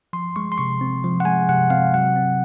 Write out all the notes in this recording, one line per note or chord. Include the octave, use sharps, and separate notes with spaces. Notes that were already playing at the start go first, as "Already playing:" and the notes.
F3 C6
G#3 C#6
C6
C3 C#6
C4
F3
F#5
G#3 G#5
C3 F#5
C4 F5
F#3 F#5
C4